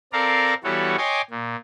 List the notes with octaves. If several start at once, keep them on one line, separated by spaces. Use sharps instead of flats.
C4 A4 A#4 D5 F5 A#5
E3 G3 B3 F#4 A4 C#5
C#5 D#5 G5 G#5 C6 D6
A#2